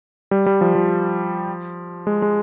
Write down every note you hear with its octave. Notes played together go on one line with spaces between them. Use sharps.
G3
G3
F3
F3
G#3
G#3